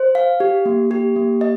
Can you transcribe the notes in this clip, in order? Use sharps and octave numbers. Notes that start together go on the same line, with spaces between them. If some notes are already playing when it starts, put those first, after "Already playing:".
Already playing: C5
F5
G4
A#3
G4
A#3
D#5